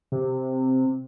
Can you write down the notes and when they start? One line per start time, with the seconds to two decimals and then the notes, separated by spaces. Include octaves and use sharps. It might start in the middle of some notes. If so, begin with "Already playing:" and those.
0.12 C3